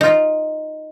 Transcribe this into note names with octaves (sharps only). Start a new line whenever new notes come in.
D#4 F4